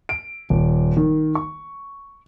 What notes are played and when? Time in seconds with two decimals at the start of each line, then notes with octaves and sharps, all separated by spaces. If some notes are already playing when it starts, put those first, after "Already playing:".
0.09 D7
0.50 D#1
0.97 D#3
1.35 C#6